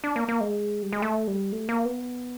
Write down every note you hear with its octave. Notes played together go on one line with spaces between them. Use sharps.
D4
A#3
A#3
G#3
G3
G#3
A3
G3
A3
A#3
B3